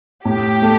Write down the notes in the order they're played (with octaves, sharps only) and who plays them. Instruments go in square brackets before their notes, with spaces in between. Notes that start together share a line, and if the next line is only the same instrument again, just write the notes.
[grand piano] A2 [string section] G4
[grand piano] A3